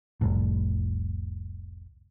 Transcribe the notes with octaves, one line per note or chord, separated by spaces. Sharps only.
F1 C2 A2